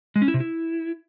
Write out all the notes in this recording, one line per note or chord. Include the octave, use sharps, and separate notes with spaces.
G#3
C#4
E4
C3
E4